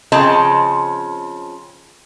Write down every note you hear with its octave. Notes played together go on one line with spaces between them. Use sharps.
C#3 F3 C4 D#5 A5